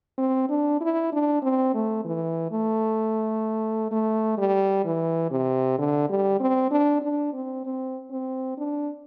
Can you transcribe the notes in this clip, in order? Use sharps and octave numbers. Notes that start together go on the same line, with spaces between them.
C4
D4
E4
D4
C4
A3
E3
A3
A3
G3
E3
C3
D3
G3
C4
D4
D4
C4
C4
C4
D4